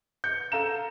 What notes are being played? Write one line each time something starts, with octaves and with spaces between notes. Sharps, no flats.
G6 C#7
A4 F5 A#5 E7